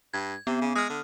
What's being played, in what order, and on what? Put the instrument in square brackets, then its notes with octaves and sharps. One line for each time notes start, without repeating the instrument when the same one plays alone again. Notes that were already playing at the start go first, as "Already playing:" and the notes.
[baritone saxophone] G2 [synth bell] G#6
[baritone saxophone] C3 [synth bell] B3
[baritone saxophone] C#3
[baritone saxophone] G#3 [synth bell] D#6 F6
[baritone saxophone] D3